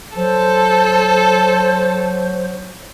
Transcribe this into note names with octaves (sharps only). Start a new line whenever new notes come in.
F#3 A4 C5